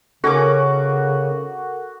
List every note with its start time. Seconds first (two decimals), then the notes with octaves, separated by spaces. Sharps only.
0.24 C#3 C#4 F#4 A4 A#4 D6